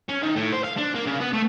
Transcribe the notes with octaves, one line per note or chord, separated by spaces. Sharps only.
C#4
D#3
A2
C5
F5
D4
A#3
C#3
B3
A3